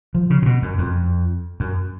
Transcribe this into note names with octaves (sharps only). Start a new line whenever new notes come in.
F3
C#3
A#2
B2
F#2
F2
F#2